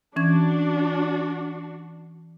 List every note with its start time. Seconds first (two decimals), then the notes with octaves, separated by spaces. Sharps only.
0.16 E3 C#4 D4 F#4 G#6